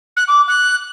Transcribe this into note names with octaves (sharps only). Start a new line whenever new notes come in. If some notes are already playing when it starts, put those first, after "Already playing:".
F#6
D6
F#6